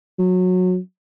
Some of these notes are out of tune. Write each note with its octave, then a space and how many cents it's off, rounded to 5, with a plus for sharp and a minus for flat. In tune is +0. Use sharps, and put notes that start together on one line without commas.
F#3 -20